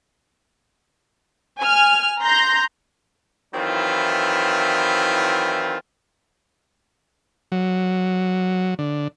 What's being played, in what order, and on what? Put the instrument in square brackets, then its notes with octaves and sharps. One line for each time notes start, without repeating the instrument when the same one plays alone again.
[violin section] G#5 F6
A#5 C6 G6 A#6
[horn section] D#3 E3 F#3 C4 E4 F4
[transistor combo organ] F#3
D3